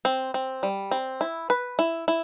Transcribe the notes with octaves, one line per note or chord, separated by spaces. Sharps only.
C4
C4
G3
C4
E4
B4
E4
E4